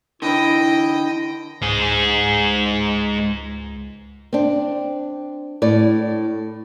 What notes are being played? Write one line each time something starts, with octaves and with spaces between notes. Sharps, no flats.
D3 E3 E4 D#5 G5
C#2 G#2 G#4
C4 D4
A2 D5